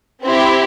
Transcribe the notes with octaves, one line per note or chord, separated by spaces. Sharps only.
C4 E4 G4 C5